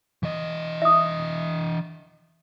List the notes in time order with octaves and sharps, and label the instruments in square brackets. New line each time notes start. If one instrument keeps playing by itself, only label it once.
[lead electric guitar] E3 D#5
[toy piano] E5 D#6